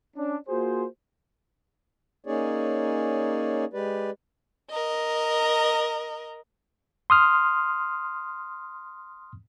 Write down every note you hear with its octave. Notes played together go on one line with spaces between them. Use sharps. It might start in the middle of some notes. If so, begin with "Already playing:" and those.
C#4 D4
A#3 F4 F#4 G#4 C5
A#3 C#4 D#4 G#4 C#5 D5
G#3 G4 B4 D5
A#4 D#5
C6 D#6 F6